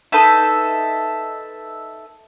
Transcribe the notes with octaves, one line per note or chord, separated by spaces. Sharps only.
D#4 A4 B4 E5